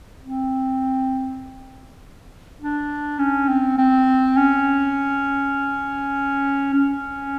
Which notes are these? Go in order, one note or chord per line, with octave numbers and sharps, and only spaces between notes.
C4
D4
C#4
C4
C4
C#4
C#4